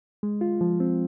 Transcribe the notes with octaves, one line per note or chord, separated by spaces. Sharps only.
G#3
F4
F3
C4